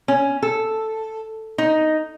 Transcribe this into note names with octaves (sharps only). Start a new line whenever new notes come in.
C#4
A4
D#4